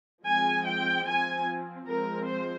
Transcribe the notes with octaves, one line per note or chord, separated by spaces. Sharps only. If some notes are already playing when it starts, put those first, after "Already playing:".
F3 G#3 C4 G#5
G5
F3 C4 G#5
F3 G#3 C4 A#4
C5